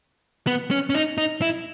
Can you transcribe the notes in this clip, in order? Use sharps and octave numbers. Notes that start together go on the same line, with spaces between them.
B3
C#4
C#4
D#4
D#4
E4